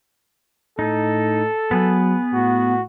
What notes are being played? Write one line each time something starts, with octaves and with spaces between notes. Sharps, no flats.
A2 D#4 A4
F#3 B3 G#4 B4
A2 F#4